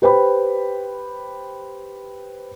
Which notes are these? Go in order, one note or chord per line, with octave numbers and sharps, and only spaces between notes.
G4 B4 C5 G5 B5